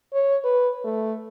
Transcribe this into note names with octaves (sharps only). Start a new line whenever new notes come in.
C#5
B4
A3